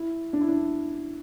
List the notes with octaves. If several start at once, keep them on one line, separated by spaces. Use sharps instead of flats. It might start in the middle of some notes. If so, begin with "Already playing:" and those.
Already playing: E4
D4
E4
D4